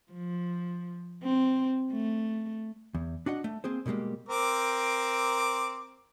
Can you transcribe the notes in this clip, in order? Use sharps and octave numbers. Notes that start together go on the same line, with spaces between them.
F3
C4
A3
E2
D4 F#4 D#5 F#5
A3
A#3 C4 G#4 C5
B2 D3 G3 G#3 A#3
C4 A#4 D6